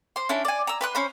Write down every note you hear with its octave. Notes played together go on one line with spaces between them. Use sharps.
C5 C6
C#4 D4 E4
D5 G#5
A#5 E6
B4 C6 F#6
C#4 C5 B5